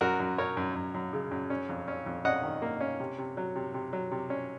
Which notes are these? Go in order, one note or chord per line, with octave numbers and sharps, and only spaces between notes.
F#2 F#4 A#4
F#2
F#2 A#4 C#5
F#2
F#2
F#2
C#3
F#2
C#4
F2
C#4
F2
C#4 D#5 F#5
D#3
A#3
C#4
C3
C3
F#3
C3
C3
F#3
C3
C#4